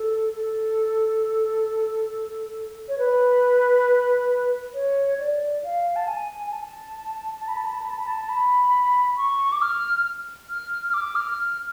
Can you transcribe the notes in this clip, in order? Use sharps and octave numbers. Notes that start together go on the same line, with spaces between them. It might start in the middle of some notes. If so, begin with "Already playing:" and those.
Already playing: A4
A4
C#5
B4
C#5
D5
F5
A5
G#5
G#5
A5
A5
B5
A5
B5
A5
B5
A5
B5
A5
B5
C#6
D6
F6
F6
F6
D6
F6
F6